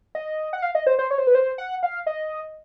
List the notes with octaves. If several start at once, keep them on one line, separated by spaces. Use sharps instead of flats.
D#5
F#5
F5
D#5
C5
C5
C#5
C5
B4
C5
F#5
F5
D#5